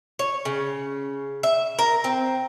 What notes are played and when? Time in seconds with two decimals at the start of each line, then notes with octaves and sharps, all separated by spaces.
0.19 C#5
0.45 C#3
1.43 E5
1.79 A#4
2.04 C4